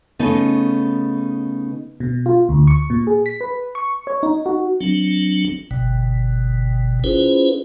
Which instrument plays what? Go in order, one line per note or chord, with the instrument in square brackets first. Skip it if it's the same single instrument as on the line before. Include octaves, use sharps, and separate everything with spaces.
[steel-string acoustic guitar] C#3 A3 B3 D#4
[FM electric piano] B2
F4
D2
C#6
A#2
G#4
B6
B4
C#6
C#5
D#4
F#4
[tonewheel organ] F#3 C4 D4
G1 B2
C#4 E4 F4 G#4 B4 C5